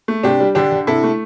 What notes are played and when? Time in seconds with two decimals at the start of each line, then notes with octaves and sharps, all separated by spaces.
0.08 A3
0.23 C3 D4 G4
0.40 G3
0.55 D3 D4 G4
0.72 D3
0.87 C3 E4 A4
1.04 A3